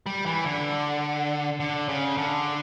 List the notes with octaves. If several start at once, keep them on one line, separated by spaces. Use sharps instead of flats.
G3
E3
D3
D3
C#3
D3